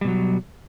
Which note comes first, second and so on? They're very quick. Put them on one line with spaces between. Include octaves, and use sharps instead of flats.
G3 B2 F#3